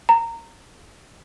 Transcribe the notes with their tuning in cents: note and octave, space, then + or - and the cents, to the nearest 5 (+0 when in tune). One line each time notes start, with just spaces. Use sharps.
A#5 -20